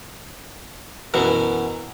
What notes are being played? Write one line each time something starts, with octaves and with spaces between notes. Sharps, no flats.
F#2 B2 E3